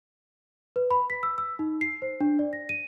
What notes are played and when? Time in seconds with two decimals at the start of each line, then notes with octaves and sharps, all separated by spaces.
0.76 B4
0.91 B5
1.10 B6
1.23 E6
1.38 E6
1.59 D#4
1.81 C7
2.02 C5
2.21 D4
2.39 D5
2.53 A#6
2.69 D#7